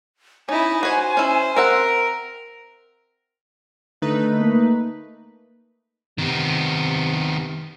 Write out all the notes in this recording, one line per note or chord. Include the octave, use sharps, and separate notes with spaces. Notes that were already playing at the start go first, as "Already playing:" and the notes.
C#4 D#4 E4 G#5
F#4 C5 C#5
C#4 E4
C4 A#4 E5 F#5
D3 A3 D#4 B4
A#3
C3 D#3 B3